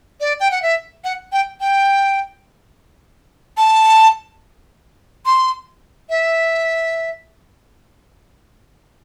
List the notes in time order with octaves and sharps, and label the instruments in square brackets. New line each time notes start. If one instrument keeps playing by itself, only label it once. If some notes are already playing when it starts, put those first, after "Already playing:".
[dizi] D5
G5
F#5
E5
F#5
G5
G5
A5
C6
E5